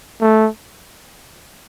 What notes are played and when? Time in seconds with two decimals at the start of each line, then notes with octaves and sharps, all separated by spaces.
0.21 A3